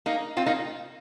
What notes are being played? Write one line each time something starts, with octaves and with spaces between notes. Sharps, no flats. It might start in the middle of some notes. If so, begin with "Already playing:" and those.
A#3 D#4
C4 F4
A#3 D#4